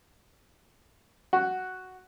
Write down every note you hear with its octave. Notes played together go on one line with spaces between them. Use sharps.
F#4